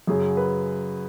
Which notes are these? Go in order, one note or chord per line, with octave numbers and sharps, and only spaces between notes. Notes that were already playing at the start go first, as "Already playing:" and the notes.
F#2 C#3 F#3 G#4
B4